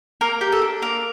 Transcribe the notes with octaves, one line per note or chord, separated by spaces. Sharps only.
A#3 A#4
G4
A4
D4
A#3 A#4